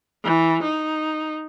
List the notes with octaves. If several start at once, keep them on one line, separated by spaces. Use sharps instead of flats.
E3
D#4